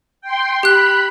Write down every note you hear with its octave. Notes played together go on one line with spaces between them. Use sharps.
G5 C6
G4 B5 F#6